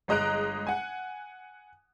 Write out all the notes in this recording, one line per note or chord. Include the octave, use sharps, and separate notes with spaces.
G1 G#3 D#5 A#5 F#6 D7
F#5 G#5